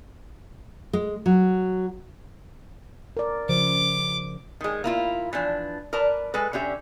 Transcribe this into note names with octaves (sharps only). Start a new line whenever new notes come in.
G#3
F#3
A#4 D5
C#3 F3 C5 D6
D#3 G#3
A#3 E4 F4
E3 F3 D4
A#4 B4 D5 A5
G#3 A4 B4
D3 C#4 G4 E5